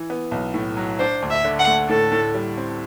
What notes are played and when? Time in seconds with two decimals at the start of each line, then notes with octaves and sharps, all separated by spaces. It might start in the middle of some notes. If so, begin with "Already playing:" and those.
Already playing: E3
0.10 B3
0.31 B1
0.54 A2
0.77 F#3
0.99 D4 C5
1.22 D2
1.30 E5
1.44 D3
1.59 F#5
1.67 A3
1.89 A2 A4
2.11 A2
2.34 G3
2.57 C4